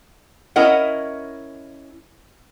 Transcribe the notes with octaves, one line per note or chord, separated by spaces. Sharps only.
C#4 E4 A#4 D#5 F#5